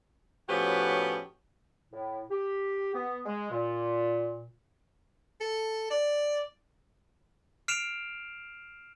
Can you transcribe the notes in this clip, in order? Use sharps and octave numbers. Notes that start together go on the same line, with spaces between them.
A2 F3 B3 C#4 F#4 G4
A2
G4
B3
G#3
A#2
A4
D5
F6 C7 D7 E7 F7